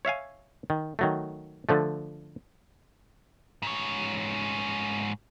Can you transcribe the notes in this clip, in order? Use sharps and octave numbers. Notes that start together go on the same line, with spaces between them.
C#5 E5 F5 G#5
D#3
D#3 F#3 A3
D3 F3 A3
G#2 C#5